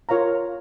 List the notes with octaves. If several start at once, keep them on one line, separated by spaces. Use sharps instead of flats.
F4 A#4 C#5 F5 A#5